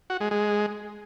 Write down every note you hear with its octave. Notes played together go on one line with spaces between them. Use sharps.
F#4
G#3
G#3